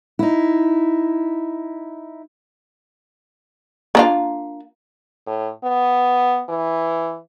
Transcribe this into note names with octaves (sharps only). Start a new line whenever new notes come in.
D#4 E4
A#3 D4 F4
A2
B3
E3